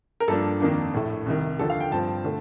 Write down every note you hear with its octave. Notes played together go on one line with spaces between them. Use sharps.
A#4
G2 F3 A#3 D4 A4
F2 D#3 A#3 D4
A#1 A2 A3
C2 C3 D#3
D#2 D3 F3 A4
F5
G5
G2 F3 C4 A5
D3 A3